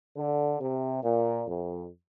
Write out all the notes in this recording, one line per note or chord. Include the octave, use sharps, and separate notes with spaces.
D3
C3
A#2
F2